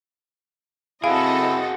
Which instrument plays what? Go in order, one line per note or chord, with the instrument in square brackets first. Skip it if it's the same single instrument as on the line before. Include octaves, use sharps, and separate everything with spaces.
[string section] C4 A4 D#5 [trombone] E4 [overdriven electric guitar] F#4 G#4 [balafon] F5